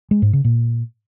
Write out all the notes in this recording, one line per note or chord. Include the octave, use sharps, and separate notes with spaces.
G#3
G#2
C#3
A#2